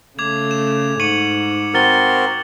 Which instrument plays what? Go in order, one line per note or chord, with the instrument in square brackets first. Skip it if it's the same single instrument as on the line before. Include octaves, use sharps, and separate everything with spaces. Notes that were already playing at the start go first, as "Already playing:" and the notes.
[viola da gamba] C#3 A3 [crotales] D6 G#6 F7
[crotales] E7
[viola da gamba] G#2 [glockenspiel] C#6 D6 D#7 [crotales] C#7 F#7
[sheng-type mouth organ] C4 F#4 A#4 [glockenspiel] F6 A6 G7